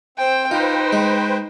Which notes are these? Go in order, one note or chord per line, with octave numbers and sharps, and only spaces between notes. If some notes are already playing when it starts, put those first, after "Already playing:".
C4 C5 G5
D#4 F4 B4 C5 G5
G#3